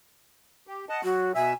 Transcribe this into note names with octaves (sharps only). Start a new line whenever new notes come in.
G4
D#5 F#5 A5
F#3 F#4
B2 E5 G#5 E6